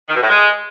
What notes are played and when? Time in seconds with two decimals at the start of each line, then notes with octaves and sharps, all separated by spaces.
0.08 D#3
0.15 B2
0.22 A2
0.29 G#3